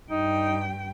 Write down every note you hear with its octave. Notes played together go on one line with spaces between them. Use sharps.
G2 D#4 G5